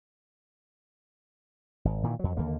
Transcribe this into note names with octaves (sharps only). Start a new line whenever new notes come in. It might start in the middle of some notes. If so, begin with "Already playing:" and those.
G#1
A#2 D#3 E3
F2 F#3
D#2 D3 A#3